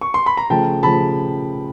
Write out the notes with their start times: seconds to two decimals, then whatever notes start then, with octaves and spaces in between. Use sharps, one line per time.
0.01 C#6
0.14 C6
0.26 B5
0.37 A#5
0.50 C#3 F3 A3 G5 A5
0.83 C#3 F3 A3 A5 B5